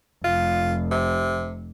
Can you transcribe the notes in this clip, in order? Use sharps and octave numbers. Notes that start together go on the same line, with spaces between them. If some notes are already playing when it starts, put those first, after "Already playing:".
F1 F4
C3